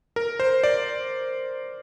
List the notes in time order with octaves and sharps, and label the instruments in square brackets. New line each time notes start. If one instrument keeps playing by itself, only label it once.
[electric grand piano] A#4
C5
D5